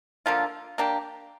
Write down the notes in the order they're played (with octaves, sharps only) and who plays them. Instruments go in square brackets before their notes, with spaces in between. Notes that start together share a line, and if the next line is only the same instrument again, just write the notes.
[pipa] D3 F3 A#3 F4
A#3 D4 G4